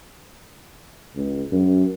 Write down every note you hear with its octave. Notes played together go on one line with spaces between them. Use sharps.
C#2
F#2